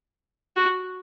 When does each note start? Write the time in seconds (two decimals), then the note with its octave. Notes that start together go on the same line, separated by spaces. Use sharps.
0.56 F#4